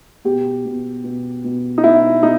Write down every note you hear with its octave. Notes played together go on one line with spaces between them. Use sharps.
B2 G4
B2
B2
B2
D#4
B2 E4
B2 D#4